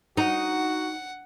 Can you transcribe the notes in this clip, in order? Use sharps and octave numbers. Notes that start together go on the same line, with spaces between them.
D#4 F#4 F#5